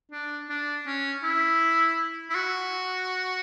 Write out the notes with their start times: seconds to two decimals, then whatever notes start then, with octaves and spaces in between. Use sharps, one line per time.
0.12 D4
0.50 D4
0.87 C#4
1.23 E4
2.30 E4
2.35 F#4